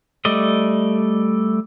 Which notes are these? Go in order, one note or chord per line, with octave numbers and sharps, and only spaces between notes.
G3 A3 D5 D#5